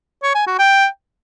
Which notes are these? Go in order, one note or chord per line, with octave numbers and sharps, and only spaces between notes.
C#5
G#5
F#4
G5